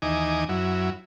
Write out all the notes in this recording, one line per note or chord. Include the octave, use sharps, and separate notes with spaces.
D#2 E3 D#4 D#5 G#5 D6
F#2 F#3 E4